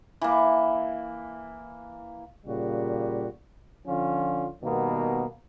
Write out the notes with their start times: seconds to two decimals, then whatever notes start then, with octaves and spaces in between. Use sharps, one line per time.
0.21 E3 A#3
2.45 A#2 C#3 G3 F#4
3.87 D3 F3 C#4 F4
4.63 B2 D#3 G3 A#3 B3